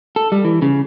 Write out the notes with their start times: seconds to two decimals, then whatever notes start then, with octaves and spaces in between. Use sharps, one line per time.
0.16 A4
0.32 G3
0.45 E3
0.62 C#3